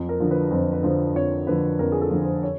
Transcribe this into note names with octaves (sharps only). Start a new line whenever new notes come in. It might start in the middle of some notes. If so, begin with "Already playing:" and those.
Already playing: F2
A#4
D3 F3
B4
F2 C5
B4
D3 F3 C5
F2 C#5
D3 F3 B4
F2 A#4
G#4
A4
D3 F3
C5
C#5